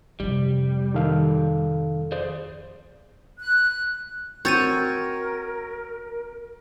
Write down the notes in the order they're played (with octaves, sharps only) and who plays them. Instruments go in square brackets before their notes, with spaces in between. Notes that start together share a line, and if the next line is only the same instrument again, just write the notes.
[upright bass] F2 C3 [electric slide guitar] G3
[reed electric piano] D#3 A4 F5
[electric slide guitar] G#4 C5 D5
[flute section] F#6
[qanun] C4 F#4 [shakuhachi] A#4 [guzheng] C#5 [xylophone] G6 A6 D#7